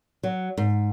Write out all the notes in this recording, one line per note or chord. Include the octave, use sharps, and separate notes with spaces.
F#3
G#2